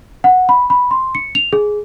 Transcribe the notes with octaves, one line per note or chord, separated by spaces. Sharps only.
F#5
B5
B5
C6
C#7
F7
G#4